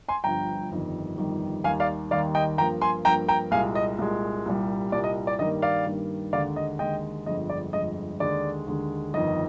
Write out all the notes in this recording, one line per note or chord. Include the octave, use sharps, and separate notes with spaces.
G#5 C6
G1 G2 F3 G5 A#5
G1 F2 D#3 G3
G1 F2 D#3 G3
D#2 D#3 G3 F5 G#5
D5 F5
D#2 D#3 G3 D5 F5
D#5 G5
G2 F3 A#3 G5 A#5
G#5 C6
G2 F3 A#3 G5 A#5
G5 A#5
C2 A#2 G#3 F5 G#5
D#5
C2 A#2 G#3
C2 A#2 G3
C2 A#2 G3 D5
D#5
D5
G2 D#3 G3 A#3 D#5
D5 F5
G2 D#3 G3 A#3
D#2 D3 G#3 D5 F5
D#5
D#2 D3 G#3 D#5 G5
G1 F2 D3 G#3 D#5
D5
G1 F2 D3 G#3 D#5
D#2 D3 G#3 D5
D#2 D3 G#3
G1 F2 D#3 D#5